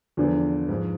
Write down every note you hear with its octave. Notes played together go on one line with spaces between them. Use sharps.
E2 D3 F3
G#2 F3